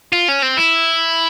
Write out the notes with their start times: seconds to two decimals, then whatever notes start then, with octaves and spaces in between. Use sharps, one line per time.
0.13 F4
0.29 C#4
0.43 C4
0.57 E4